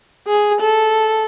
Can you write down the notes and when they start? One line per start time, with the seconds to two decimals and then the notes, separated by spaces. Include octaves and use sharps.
0.27 G#4
0.61 A4